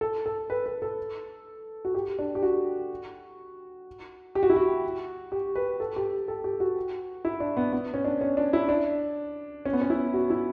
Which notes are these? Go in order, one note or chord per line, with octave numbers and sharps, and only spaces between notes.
A4
A4
B4
B4
A4
F#4
G4
D4
G4
F#4
G4
F#4
E4
F#4
G4
B4
A4
G4
A4
G4
F#4
E4
D4
B3
B3
C#4
D4
C#4
D4
E4
D4
C#4
B3
C#4
E4
F#4
E4